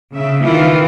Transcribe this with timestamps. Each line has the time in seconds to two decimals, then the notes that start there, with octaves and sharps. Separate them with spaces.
0.13 C#3 E5
0.42 D#3 E3 F4